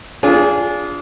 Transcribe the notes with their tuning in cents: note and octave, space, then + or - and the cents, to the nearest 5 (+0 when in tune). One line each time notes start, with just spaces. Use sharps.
D4 -25 F4 +0 G#4 -10